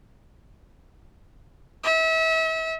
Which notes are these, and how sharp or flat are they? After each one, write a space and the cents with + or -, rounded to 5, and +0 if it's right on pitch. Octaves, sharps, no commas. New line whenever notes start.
E5 -35